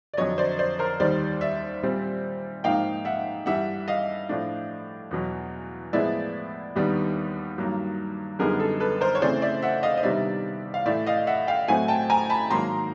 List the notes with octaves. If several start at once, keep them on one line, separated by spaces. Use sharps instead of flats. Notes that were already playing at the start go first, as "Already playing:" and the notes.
D5
F2 D3 F#3 C#5 D#5
C5 D5
C5 D5
A#4 C5
D#2 D#3 G3 C5 D5
D5 E5
A#2 G3 C4
G#2 F3 A#3 D#4 F5 G5
E5 F#5
G2 E3 G3 E5 F#5
D#5 F5
A2 F3 A3 D4
E2 B2 F#3
A2 F3 G#3 B3 E4 D5 E5
D#2 D#3 G3 B3 D4
G2 D#3 F#3 A#3
F#2 D3 G3 B3 D#4 G#4 A#4
A4
A4 B4
A#4 C5
C#5
C#3 E3 A3 C4 C5 D5
D5 E5
E5 F#5
D#5 F5
D#5
C3 D#3 G3 B3 D4 D5 E5
F5
A2 E3 A3 D5 E5
D#5 F5
E5 F#5
F5 G5
A2 F#3 A3 C4 E4 F#5 G#5
G5 A5
G#5 A#5
A5 B5
G#2 D#3 F#3 A#3 A#5 C6